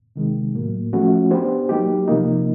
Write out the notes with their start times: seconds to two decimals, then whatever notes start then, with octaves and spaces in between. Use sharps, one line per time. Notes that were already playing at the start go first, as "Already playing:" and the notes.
0.16 C3 D#3 G#3
0.54 A2 F#3 A#3
0.93 F3 A3 C#4 F#4
1.31 B3 D4 G4 C5
1.69 F#3 A#3 D#4 G4
2.08 C3 F3 A#3 D#4